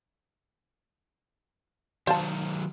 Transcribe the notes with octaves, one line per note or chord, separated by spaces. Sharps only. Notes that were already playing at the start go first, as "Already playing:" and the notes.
D#3 F#3 C5 F5 A5